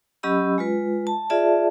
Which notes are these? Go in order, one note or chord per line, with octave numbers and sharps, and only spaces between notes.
F#3 C#4 G4 D#5 B5 E6
G#3 F4 B4
A5
F4 G#4 D5 E5 A5